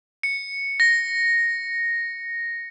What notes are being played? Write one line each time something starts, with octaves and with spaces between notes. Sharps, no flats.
C#7
A#6